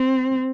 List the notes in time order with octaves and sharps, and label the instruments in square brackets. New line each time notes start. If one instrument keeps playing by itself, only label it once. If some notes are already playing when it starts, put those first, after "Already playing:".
Already playing: [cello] C4